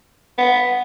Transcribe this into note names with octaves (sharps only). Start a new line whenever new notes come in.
B3